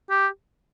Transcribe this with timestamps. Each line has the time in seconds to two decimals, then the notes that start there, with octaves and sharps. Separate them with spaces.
0.10 G4